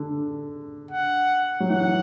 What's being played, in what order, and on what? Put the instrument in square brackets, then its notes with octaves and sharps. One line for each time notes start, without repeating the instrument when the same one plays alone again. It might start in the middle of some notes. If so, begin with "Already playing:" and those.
Already playing: [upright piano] D3
[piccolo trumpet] F#5
[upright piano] F#3
[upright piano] E3 [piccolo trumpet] F#5